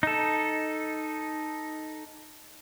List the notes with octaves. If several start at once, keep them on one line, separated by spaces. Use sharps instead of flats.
D#4 A4